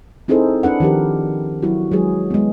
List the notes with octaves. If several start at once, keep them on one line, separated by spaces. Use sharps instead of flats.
C4 D#4 E4 G#4 A4 C5
D4 B4 F#5
D#3 F3 G4 A#4
F#3 E4 F#4
F#3 G#3 G#4 B4
G#3 B3